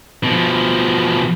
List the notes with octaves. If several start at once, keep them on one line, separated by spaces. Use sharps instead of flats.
B2 F3